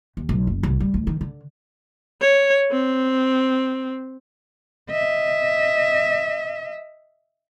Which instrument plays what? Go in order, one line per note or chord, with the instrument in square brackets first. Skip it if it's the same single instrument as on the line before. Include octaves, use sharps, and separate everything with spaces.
[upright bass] D#2
B1
F#1
C2
G3
D2
D#3
D3
[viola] C#5
C4
[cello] D#5 E5